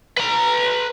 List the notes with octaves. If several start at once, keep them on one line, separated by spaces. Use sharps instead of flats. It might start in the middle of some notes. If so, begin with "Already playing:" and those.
B4 A#5